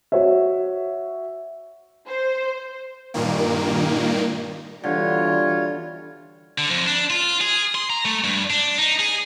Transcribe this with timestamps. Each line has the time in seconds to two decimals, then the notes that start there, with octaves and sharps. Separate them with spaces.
0.12 F#4 C#5 E5
2.08 C5
3.14 G2 A#2 D#3 A#3
4.84 B2 D3 E3 G3 F4 C#5
6.58 D3
6.70 F2
6.86 D4
7.10 F4
7.41 G#4
7.75 C6
7.90 A#5
8.05 A3
8.24 G2
8.50 D4
8.79 D#4
9.00 G#4